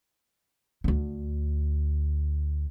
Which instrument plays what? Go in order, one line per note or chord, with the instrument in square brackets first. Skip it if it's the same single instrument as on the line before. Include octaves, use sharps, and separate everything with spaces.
[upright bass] D2 D3